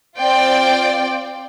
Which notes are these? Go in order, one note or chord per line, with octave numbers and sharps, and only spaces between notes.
C4 F4 D5 G5